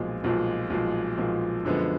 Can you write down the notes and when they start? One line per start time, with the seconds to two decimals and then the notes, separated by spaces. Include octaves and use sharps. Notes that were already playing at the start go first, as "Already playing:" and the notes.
Already playing: B1 A#2 F3 G#3
0.24 B1 A#2 F3 G#3
0.70 B1 A#2 F3 G#3
1.17 B1 A#2 F3 G#3
1.65 F#2 D3 F3 G#3 B3